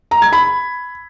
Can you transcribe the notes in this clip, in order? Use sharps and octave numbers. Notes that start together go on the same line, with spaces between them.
A#5
G#6
B5